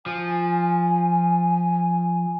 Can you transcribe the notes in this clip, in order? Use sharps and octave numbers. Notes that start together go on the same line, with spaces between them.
F3 G#5